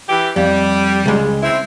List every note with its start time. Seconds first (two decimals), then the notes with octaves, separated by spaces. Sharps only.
0.09 E3 G4
0.36 F2 G3
1.06 C#2 G#3
1.42 C4 E4